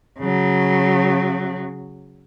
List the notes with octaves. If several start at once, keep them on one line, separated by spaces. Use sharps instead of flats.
C#3 F#3